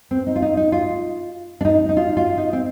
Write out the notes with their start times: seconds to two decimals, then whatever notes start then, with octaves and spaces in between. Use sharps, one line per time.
0.11 C4
0.27 D#4
0.36 F4
0.42 D#4
0.57 D#4
0.72 F4
1.61 D4
1.65 D#4
1.89 D#4
1.97 F4
2.17 F4
2.38 D#4
2.53 C4